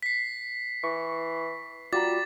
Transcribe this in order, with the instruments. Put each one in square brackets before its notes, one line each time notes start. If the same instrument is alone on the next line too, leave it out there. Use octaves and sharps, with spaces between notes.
[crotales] B6 C7
[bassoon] E3 [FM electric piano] C#6
[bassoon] G3 [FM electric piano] F4 F#4 A#5 [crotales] D6 A6